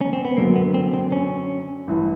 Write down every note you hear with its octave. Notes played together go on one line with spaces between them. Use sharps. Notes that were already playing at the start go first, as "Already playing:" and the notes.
C#4
C4
B3
F#2 D3 F#3 A#3
B3
C4
C4
C#4
A1 G2 E3